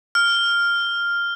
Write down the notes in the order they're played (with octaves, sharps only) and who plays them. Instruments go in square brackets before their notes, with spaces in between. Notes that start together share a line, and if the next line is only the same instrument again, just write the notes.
[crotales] F6